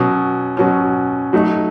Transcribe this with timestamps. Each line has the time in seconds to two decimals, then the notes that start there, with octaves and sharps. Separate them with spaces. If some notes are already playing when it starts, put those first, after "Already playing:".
Already playing: B2 F#3 C#4
0.57 B2 F#3 C#4
1.33 F#3 A3 D#4